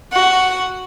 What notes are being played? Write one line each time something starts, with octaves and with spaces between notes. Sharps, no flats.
F#4